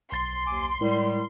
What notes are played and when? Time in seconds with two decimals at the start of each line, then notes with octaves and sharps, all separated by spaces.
0.12 B1 C6 A6
0.47 D#2 G#5 D6
0.81 A2 G3 G#3 E4 A#4